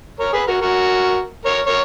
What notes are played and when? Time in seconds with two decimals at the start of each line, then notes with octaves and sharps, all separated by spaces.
0.19 A#4 C#5
0.33 G#4 B4
0.47 F#4 A#4
0.61 F#4 A#4
1.45 A#4 C#5
1.66 A#4 C#5